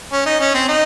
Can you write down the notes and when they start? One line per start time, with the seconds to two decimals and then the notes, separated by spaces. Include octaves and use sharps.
0.12 C#4
0.26 D#4
0.40 C#4
0.54 C4
0.68 D#4